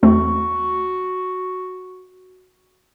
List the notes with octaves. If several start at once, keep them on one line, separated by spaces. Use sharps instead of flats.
E2 A3 C4 F#4